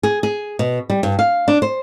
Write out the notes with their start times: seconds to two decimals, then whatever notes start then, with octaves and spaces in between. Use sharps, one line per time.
0.03 G#4
0.23 G#4
0.59 B2
0.90 G3
1.03 G2
1.19 F5
1.48 D4
1.62 C5